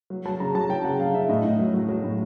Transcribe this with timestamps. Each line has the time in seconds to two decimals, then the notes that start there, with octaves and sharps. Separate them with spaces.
0.10 F#3
0.25 F#3 A5
0.40 C#3 A#5
0.55 F#3 A5
0.70 F#3 G5
0.85 C#3 F#5
1.00 C#3 F5
1.14 C#3 E5
1.29 A2 D#5
1.44 A2
1.59 F#3
1.74 F#3
1.89 F#3
2.04 A2